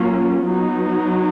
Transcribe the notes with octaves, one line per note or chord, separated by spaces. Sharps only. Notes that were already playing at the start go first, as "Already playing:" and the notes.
Already playing: F#3 A#3 C#4 F4
F#3 B3 D#4